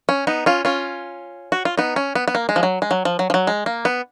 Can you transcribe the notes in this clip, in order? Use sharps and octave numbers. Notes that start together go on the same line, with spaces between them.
C#4
B3 D#4
C#4 F4
C#4 F4
F#4
F4
B3 D#4
C#4
B3
B3
A#3
G#3
F3
F#3
G#3
F#3
F3
F#3
F3
F#3
G#3
A#3
B3